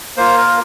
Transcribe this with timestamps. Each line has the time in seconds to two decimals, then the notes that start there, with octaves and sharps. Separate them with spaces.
0.17 A#3 F4 C5
0.38 A#4